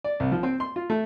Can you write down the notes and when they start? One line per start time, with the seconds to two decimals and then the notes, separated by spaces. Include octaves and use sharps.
0.04 D5
0.20 C2
0.32 F3
0.43 C4
0.60 C6
0.76 F4
0.90 A3